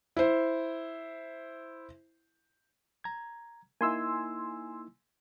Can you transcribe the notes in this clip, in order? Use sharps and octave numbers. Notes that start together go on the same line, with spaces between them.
E4 C5
A#5 G#6
A#3 D#4 E4 G#5 C6 E6